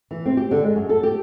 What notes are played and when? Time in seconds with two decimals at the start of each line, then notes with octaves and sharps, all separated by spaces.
0.11 E3
0.26 C4
0.37 G4
0.51 D3
0.63 G#3
0.76 F#2
0.89 A4
1.03 G4